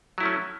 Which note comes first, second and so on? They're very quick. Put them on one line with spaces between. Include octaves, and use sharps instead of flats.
F#3 E4 A3 C#4